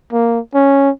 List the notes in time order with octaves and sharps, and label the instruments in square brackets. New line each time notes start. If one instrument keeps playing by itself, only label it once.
[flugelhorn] A#3
C#4